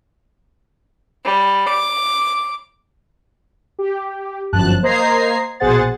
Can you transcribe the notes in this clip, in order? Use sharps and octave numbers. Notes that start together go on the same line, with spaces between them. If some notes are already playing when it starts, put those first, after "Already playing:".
G3
D6
G4
G1 F#2 F3 A5 F#6
A#3 C5 D#5 A#5 G#6 C7
A#1 B2 G#4 C5 F#5 A6